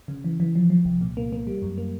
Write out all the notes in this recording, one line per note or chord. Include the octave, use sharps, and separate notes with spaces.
C#3
E3
E3
F3
F3
C2
A#2
A#3
A#3
G3
F#2
A#3